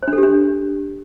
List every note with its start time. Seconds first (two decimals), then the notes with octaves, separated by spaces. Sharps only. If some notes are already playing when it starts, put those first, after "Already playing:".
0.03 C5
0.08 D4
0.13 A4
0.18 G4
0.23 D4